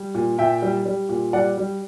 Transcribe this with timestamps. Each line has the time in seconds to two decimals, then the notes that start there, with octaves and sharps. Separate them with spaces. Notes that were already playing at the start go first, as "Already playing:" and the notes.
Already playing: G3
0.14 A#2
0.38 A#2 E5 G5
0.62 G3
0.86 G3
1.09 A#2
1.33 G3 D5 F#5
1.58 G3